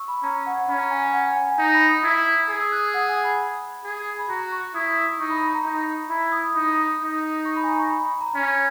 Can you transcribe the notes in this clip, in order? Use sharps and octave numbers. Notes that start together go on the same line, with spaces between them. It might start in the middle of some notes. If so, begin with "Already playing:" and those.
Already playing: C#6 E6
B5
C#4 A#5
F#5
F#5
C#4 B5
A#5
G#5
G#5
F#5
G#5
G#5
D#4 A#5
B5
D#6
E4 E6
G#4 D#6
E6
F#6
F#5
G#5
B5
G#4
B5
F#4 A#5
C#6
E4 D#6
E6
D#4 C#6
B5
B5
A#5
D#4 A#5
E4 B5
D#6
D#4 D#6
D#4
C#6
B5
G#5
A#5
C#6
B5
B5
A#5
C#4 G#5